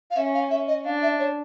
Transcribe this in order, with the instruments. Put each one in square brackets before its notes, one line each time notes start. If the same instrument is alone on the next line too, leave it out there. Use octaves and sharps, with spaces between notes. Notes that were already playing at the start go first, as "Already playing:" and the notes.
[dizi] F5
[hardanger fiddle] C#4 [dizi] E5
[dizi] F5
[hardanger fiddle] C#4 [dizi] E5
[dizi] D#5
[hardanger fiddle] D4 [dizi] F5
[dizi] E5
C#5